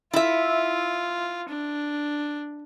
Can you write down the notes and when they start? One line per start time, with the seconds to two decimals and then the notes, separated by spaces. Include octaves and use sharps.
0.14 E4 F4 E5
1.48 D4